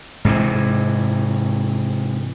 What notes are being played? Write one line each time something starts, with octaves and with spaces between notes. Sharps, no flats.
G#2 C3 E3